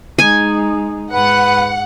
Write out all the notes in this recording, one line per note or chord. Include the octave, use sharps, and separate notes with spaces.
G#3 D#4 G#5
G#2 B4 F#5